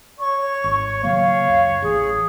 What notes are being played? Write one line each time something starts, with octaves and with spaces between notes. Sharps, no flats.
C#5 C#6
G#1
C#3 F#3 A#3 C#5 F5
C#2 F#2
A1 G#4